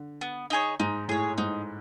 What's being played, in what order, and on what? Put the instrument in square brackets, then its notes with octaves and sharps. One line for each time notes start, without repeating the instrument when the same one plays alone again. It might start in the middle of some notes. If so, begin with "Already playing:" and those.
Already playing: [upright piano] D3
[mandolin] B3
D#4 G#4 C#5
[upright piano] G#2 [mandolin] D#4
[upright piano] A2 [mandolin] G#4 C#5
[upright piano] G#2 [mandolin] D#4